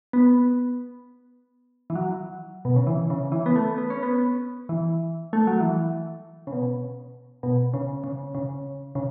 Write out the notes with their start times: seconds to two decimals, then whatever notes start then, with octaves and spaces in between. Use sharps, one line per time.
0.13 B3
1.90 E3
1.95 F#3
2.65 B2
2.76 C#3
2.87 E3
3.10 C#3
3.32 E3
3.46 B3
3.56 A3
3.78 B3
3.90 C#4
4.03 B3
4.69 E3
5.33 A3
5.47 F#3
5.61 E3
6.47 C#3
6.52 B2
7.43 B2
7.74 C#3
8.04 C#3
8.35 C#3
8.95 C#3